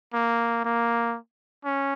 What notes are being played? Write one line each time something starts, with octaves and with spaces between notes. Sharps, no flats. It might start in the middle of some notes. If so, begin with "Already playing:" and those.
A#3
A#3
C#4